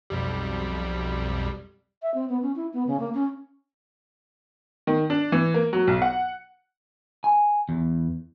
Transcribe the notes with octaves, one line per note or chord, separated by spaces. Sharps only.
B1 F2 G3
E5
C4
B3
C#4
E4
B3
C#3
A#3
C#4
D#3
D4
E3
A#3
F#3
B1
F#5
G#5
E2